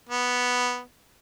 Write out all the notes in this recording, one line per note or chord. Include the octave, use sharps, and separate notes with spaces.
B3